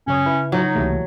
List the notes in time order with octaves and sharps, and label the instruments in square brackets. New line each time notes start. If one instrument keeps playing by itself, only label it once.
[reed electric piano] F#2 C#5 D#6 [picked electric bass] C#3 [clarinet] C#4
[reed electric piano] E4 B4
[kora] F#3 [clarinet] D#4
[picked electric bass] C#2 C3 A#3 [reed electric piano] E3 G3 A3